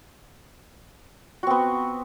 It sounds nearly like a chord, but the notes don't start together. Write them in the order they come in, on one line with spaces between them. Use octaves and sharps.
F#4 C4 B3